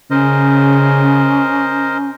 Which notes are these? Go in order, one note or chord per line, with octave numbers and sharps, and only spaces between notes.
C#3 C#4 A#4 C5 D#5